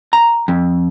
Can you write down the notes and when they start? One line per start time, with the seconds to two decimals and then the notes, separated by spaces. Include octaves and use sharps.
0.13 A#5
0.48 F2